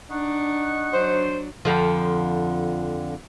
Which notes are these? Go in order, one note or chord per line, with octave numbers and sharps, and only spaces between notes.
D4 D#4 F#5 C#6
F#3 D4 C5
F2 D3 F3